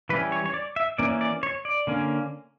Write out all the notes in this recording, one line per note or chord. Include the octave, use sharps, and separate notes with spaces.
E3 G3 C#4 B4
C#5
C#5
D5
E5
E3 A#3 C#4 D5
D5
C#5
D5
D3 A#3 C#4